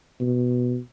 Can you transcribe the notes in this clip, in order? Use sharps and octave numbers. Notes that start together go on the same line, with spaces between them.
B2